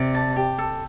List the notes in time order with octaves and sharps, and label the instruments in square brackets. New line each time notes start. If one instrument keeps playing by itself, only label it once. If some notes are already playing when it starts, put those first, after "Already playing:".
Already playing: [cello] C3 [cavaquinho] D5
[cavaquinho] A5
G4
A4